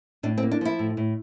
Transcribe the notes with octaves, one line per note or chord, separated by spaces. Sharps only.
A2 D4
C4
A#3
D4
F3 E4
A2
A2